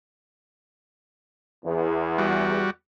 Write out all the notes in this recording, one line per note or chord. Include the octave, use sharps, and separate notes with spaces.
E2
G3 F#4